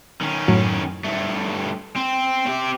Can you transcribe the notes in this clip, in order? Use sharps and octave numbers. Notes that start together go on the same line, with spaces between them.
D#3 C#4
F#2 A2 F#3
G2 A3
C4
C4 G4